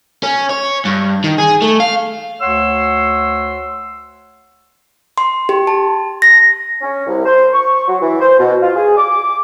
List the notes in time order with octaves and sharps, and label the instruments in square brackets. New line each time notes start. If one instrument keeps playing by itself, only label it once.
[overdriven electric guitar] C#4
C#5
G2
D#3
G#4
A3
F5
[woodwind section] D2 C#5 F#5 C6 E6
[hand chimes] C6
G4
A5
A#6
[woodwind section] C#4
C2
C5
C#6
F#3
E3
C5
B2
F4
G#4
D6